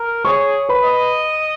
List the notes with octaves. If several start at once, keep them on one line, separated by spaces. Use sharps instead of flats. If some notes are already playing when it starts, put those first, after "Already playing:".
Already playing: A#4
G#4 C#5 C#6
B4 B5
D#5